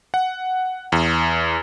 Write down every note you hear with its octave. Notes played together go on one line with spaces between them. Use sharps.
F#5
E2